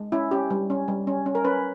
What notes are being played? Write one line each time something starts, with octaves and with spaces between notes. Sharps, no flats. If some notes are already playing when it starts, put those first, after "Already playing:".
Already playing: G#3
C#4 E4
C#4 G4
G3
C#4
G3
C#4
C#4
A#4
C#4 B4